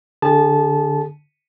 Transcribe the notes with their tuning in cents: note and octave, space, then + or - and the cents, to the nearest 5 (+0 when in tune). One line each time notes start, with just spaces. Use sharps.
D3 +0 G#4 -40 A5 -15